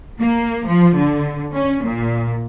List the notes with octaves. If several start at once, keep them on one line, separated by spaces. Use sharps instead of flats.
A#3
F3
D3
C#4
A#2